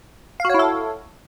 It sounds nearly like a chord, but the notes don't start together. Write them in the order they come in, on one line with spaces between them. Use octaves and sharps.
F5 F#4 C#5 E4 A4